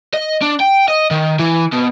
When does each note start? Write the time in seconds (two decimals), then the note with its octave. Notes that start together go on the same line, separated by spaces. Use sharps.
0.14 D#5
0.42 D4
0.60 G5
0.88 D#5
1.11 D#3
1.39 E3
1.72 B2